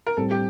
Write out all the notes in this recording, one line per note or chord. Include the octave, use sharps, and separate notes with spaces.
A#4
A2 G3 C4 A4
G4